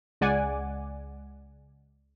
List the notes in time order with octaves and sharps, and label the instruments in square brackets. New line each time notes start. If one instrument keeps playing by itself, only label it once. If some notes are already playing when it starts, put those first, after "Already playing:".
[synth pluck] C#2 G#3 D5 F#5 G#5 D6